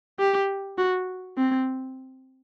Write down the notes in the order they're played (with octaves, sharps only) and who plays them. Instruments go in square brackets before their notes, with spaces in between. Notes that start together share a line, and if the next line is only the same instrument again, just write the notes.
[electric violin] G4
F#4
C4